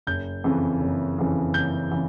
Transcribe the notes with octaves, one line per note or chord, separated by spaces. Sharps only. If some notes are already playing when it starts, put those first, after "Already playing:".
F#1 G6
F2 C#3 E3
F#1
F2 C#3 E3
F#1 G6
C#3 E3